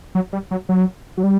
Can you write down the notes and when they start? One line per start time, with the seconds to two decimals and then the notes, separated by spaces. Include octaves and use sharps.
0.15 F#3
0.33 G3
0.51 F#3
0.69 F#3
1.17 F#3
1.23 G3